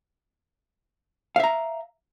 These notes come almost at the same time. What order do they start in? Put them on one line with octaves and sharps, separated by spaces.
F5 E5 A#5